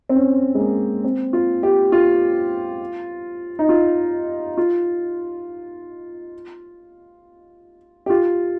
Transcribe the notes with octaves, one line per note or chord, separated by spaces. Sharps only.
C4
C#4
G#3
A#3
C4
F4
G4
F4
D#4
F4
F4
G4
F4